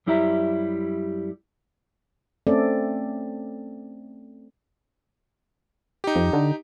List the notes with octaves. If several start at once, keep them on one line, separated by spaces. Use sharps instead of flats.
F#2 G3 E4 G4 E5 A#5
A3 C4 C#4 A4 D5 E5
D#4 G4
F2
D3